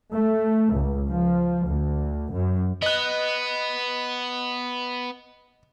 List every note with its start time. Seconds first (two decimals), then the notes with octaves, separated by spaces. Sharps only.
0.11 A3
0.72 C#2
1.10 F3
1.67 D2
2.33 F#2
2.82 B3 D#5 F#6